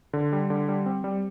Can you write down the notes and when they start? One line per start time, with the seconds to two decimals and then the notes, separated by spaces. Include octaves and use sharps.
0.13 D3
0.33 G3
0.50 D3
0.68 G3
0.86 C4
1.04 G3